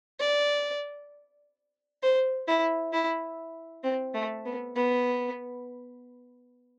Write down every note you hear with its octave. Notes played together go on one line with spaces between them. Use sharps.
D5
C5
E4
E4
C4
A3
B3
B3